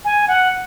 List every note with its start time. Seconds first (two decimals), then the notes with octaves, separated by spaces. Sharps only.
0.05 G#5
0.28 F#5